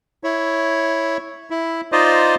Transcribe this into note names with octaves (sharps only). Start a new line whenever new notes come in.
E4 C#5
E4
D#4 F4 C5 D5 D#5